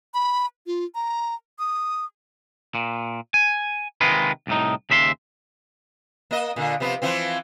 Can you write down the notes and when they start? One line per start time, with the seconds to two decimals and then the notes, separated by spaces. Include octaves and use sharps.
0.14 B5
0.67 F4
0.95 A#5
1.59 D#6
2.75 A#2
3.34 G#5
4.01 C3 D#3 G#3 F4 B4
4.47 C2 A2 D#4
4.90 D#2 C#3 E5 B5 C6
6.31 A#3 D#5
6.56 A#2 D3
6.80 C3 F3 B3
7.02 E3 F3 C4